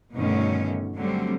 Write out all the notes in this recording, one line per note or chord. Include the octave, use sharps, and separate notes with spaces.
G2 B2 D3 D#3 A3 C#4
D3 F#3 G3 A3 C4